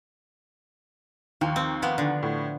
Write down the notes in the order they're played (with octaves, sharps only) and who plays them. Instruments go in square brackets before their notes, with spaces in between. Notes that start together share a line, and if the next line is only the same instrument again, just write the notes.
[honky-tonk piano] D#2 [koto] F3
[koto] C4
F3 B3
D3
[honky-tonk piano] A2